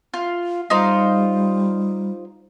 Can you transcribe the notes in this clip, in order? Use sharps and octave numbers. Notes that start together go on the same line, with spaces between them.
F4
G3 D#4 F4 C5